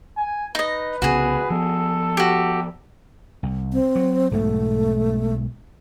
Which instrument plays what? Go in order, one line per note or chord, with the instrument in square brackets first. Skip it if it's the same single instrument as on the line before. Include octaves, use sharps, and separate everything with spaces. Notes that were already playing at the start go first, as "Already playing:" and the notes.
[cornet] G#5
[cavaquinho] D#4 D#5 [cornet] B4
[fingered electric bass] C2 C#3 B3 [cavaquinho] F#4 G#4
[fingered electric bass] F3 B3 [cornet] A4
[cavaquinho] F#4 G4
[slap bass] C2
[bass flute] C4
[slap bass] F#3
[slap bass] B1 G#2 B2 [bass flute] A3